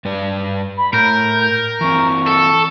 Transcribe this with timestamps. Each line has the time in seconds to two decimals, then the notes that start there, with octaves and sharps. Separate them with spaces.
0.05 G2 B4 D5
0.77 B5
0.93 A2 A#4 G6
1.81 E3 C4 C#6
2.27 A4